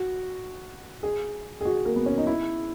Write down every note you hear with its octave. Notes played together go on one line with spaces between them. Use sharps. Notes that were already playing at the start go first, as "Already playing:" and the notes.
Already playing: F#4
G#4
G#4
F#4
A#3
B3
C#4
D#4
E4